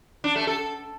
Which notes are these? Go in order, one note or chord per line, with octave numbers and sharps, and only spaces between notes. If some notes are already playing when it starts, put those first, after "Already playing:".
D4
A3
A4